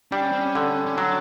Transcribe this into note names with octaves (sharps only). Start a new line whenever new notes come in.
G3 D4
C#4
C4
C#4
D3
C#4
F#3 D4